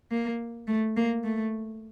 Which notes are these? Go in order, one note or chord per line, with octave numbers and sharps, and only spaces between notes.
A#3
A3
A#3
A3